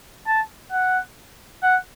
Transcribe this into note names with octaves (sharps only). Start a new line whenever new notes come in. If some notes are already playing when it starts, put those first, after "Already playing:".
A5
F#5
F#5